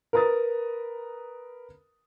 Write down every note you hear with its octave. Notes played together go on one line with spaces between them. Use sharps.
A#4 B4 A#5 D#6 A6